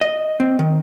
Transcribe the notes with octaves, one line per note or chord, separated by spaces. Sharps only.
D#5
C4
D#3